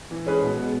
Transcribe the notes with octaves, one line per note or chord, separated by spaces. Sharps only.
E3
G#3 C#4 G#4 B4
B2
G#3 B3